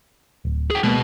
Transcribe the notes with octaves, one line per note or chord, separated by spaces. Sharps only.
D1
G#4 G5
B2 G#3 A#3